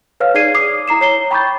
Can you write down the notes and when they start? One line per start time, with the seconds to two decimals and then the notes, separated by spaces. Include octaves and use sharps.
0.20 B4 C#5 F5 F6
0.34 D#4 G#4 D5 G#6 C7 D#7
0.54 D6 D#6 C7
0.88 E4 A#5 C7 E7
1.01 C#5 C7 G7
1.31 G5 B5 C#6 D6 G6 A6